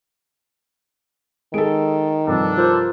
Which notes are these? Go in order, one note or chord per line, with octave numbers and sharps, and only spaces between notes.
D#3 G#3 A4 D7
G2 C3 F3 D4 A4
F4 A#4 C5